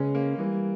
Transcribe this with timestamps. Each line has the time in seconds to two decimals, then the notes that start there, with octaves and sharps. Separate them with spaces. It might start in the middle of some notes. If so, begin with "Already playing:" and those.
Already playing: C#3 G#3 B3 C#4
0.15 A#3
0.39 E3 G3